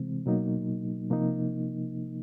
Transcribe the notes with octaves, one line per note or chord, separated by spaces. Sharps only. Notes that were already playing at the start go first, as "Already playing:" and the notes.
Already playing: C3 E3 G#3 C4
B2 F#3 A#3 D#4
C3 F3 A#3 D#4